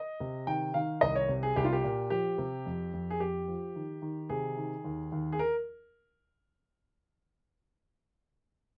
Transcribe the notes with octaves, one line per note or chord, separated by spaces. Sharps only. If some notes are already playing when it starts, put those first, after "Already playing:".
Already playing: D#5
C3
D#3 G5
D#3 F5
C2 D#5
C#5
C3
G#4
C2 G4
F4
G4
A#2
F3 G4
C3
F2
F2
G#4
F2 G4
F3
D#3
D#3
C3 G#4
D#3
D#2
D#2
G#4
A#4